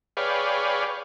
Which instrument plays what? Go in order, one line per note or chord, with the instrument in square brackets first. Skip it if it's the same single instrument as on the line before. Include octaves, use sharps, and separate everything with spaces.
[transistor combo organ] G#4 B4 C#5 D5 F5 G5